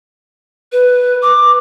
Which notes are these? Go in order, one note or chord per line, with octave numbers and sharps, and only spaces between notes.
B4
D6